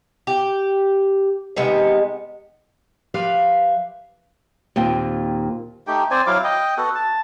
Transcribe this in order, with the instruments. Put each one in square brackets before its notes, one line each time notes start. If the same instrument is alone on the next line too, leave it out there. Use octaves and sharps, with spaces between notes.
[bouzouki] G4
C3 D#3 G#3 B3
[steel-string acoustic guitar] F3 G4 B4 E5 F5
[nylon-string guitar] D#2 A#2 C4 G5
[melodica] A3 D#4 G4 G5
C4 C5 D5 G#5
F#3 E4 F5 D6
D#5 G5
B3 F#4 A4 F#5
A5